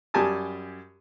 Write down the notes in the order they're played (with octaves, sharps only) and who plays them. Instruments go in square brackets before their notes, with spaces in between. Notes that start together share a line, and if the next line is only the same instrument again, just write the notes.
[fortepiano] F#2 G3 G4 G#5 A5 D#6